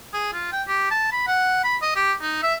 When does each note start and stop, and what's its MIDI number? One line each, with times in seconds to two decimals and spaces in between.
0.14 0.30 68
0.33 0.52 65
0.53 0.62 79
0.68 0.88 67
0.91 1.10 81
1.12 1.23 83
1.27 1.61 78
1.64 1.76 83
1.82 1.95 75
1.95 2.13 67
2.21 2.41 63
2.43 2.55 76